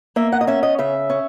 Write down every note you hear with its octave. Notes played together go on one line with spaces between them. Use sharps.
A#3 E5
F#5
D#5
C#4 E5
D#5
C#3 E5
C#4